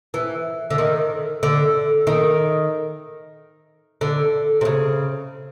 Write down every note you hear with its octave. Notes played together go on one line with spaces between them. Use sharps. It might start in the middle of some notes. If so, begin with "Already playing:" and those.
E3
D3
D#3
D3
D#3
D3
C3
C#3